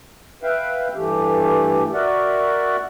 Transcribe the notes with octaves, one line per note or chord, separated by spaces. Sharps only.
B4 E5 F5 G5
G2 E3 A3 G4
F#4 A#4 D5 E5 F#5